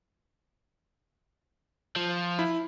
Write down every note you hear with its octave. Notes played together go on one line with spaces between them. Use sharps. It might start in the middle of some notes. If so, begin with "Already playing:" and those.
F3
E4